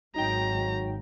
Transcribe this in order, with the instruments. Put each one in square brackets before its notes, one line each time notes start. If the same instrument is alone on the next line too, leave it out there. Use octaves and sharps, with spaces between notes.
[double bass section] G#1 [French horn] F#3 [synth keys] D#4 G5 [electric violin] A#5